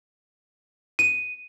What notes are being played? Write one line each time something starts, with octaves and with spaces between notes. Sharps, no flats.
D#7